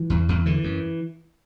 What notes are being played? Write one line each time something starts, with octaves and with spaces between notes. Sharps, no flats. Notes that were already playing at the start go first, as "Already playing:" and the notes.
Already playing: E3
E2
E2
D3 E3
F#2